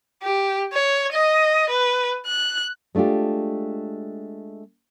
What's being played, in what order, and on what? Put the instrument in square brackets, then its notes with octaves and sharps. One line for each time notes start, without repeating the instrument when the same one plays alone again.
[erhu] G4
C#5
D#5
B4
F#6
[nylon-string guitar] G#3 A3 D4 F4 G4